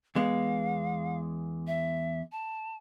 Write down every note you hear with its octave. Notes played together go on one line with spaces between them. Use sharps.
E2 G#3 B3 F5
E5
A5